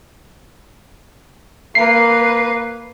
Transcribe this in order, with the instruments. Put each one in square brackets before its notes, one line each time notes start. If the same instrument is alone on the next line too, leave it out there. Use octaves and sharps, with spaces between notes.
[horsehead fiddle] A#3 B4 [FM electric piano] C7